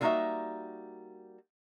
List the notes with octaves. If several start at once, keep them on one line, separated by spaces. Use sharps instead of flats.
D3 G3 A#3 D#4 F#4 E5